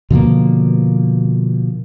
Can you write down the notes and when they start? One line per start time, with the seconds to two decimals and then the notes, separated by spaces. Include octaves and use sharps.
0.10 B2 D3 F3 A#3